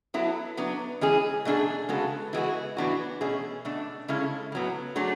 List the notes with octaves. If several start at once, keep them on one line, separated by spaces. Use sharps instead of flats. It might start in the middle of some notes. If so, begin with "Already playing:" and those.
F#3 B3 E4 A4
F#3 B3 D4
E3 G#3 C#4 G#4
B2 A3 D4 G#4
C#3 G#3 B3 F#4 A4
E3 G#3 B3 F#4
A2 E3 B3 D4 F#4
B2 A3 C#4 G#4
B2 A3 D4
C#3 G#3 C#4 E4 A4
A2 F#3 B3
F#3 A3 D4 G#4